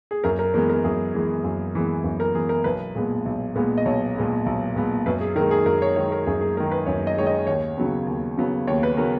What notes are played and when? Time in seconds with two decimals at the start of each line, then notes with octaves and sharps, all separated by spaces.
0.11 G#4
0.24 F#2 A#4
0.39 A#4
0.54 E3 G#3 B3 A#4
0.69 A#4
0.84 F#2 G#4
1.15 E3 G#3 B3
1.44 F#2
1.75 E3 G#3 B3
2.04 F#2
2.20 A#4
2.35 E3 G#3 B3 G#4
2.49 A#4
2.64 B1 B4
2.95 A#2 G#3 B3
3.25 B1
3.56 A#2 G#3 B3
3.78 D#5
3.85 B1 C#5
4.15 A#2 G#3 B3
4.46 B1
4.76 A#2 G#3 B3
5.06 F#2 B4
5.21 G#4
5.36 D#3 A#4
5.40 G#3
5.51 G#4
5.66 F#2 A#4
5.82 C#5
5.96 D#3 G#3 C#5
6.12 A#4
6.26 F#2 G#4
6.41 G#4
6.56 G#3 A#4
6.60 D#3
6.71 B4
6.86 F#2 C#5
7.07 D#5
7.17 D#3 G#3 C#5
7.27 D#5
7.47 D#2 C#5
7.77 C#3 F#3 B3
8.07 D#2
8.37 C#3 F#3 B3
8.67 D#2 C#5
8.83 B4
8.97 C#3 F#3 B3 A#4